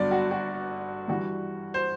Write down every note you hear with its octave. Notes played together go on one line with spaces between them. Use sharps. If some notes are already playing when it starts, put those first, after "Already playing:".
Already playing: G1 G2 D3 F#3 B3 D5
F#4
F#4
G2 E3 G3 F#4
C5